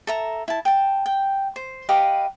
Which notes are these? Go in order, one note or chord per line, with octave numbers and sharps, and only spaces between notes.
A4 E5 A#5
E4 A5
G5 A5
G5
C5
G4 B4 D#5 F5